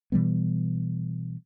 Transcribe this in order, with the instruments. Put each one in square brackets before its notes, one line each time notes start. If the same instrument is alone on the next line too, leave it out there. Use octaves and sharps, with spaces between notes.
[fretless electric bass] B2 E3 G3 B3